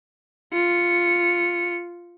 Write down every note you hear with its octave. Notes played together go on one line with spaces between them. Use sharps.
F4 C#7